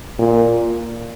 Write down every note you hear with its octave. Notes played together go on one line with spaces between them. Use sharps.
A#2